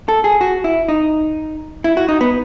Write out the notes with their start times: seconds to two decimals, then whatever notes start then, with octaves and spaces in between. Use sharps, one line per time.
0.08 A4
0.24 G#4
0.41 F#4
0.64 E4
0.88 D#4
1.84 E4
1.97 F#4
2.09 D#4
2.21 B3